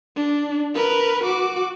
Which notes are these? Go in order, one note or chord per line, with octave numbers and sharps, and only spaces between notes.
D4
A#4 B4
F#4 D6